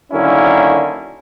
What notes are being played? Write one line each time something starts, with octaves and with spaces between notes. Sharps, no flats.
D3 D#3 F#3 A#3 C#4 E4